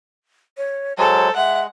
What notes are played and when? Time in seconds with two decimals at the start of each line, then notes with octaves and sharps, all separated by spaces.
0.58 C#5
0.98 F#3 G#3 A4 C5
1.36 G#3 E5 F#5